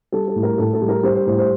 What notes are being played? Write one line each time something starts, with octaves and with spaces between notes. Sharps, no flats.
G3 A4
A4
A2
A#4
A2 A4
A4
G3
A#4
G3 C5
C5
A2 C5
C5